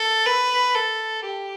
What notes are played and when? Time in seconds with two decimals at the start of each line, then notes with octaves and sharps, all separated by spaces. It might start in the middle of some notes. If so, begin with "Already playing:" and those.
Already playing: A4
0.26 B4
0.75 A4
1.25 G4